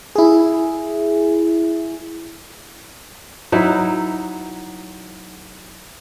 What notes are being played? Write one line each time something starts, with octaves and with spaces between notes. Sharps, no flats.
E4 G#4
F#3 D#4 E4